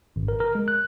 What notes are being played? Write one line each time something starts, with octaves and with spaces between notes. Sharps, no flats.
G#1
A#4
A#4
G#3
F#6